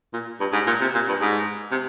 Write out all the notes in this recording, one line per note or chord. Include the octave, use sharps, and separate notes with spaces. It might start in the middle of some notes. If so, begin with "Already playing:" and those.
A#2
G2
G#2
A#2
C3
A#2
G2
G#2
C3